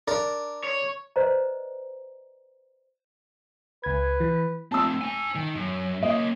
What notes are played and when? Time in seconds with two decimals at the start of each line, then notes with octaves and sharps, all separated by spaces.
0.08 D4 A#4
0.64 C#5
1.16 B4 C5 D5 D#5 A#5
3.84 C#2 B4 G#6
4.20 E3
4.72 A3 C4 A5 E6
5.01 C5 G#5
5.35 D#3
5.55 F#2
6.03 A#3 C#4 D#5